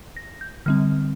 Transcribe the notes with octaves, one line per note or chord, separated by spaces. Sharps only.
A#6
G6
D3 G3 C4 F6